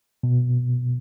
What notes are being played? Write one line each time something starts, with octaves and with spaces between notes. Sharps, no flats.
B2